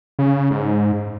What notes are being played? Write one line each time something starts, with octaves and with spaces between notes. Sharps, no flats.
C#3
G#2